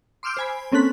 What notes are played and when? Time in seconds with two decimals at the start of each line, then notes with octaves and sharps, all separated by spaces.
0.23 C6 D6 E6 F6 G6 D7
0.37 C5 G#5 B5
0.72 A#3 C4 C#4 A4 F#6 B6